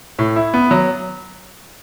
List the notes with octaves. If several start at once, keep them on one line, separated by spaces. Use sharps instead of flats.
A2
E4
B3
F#3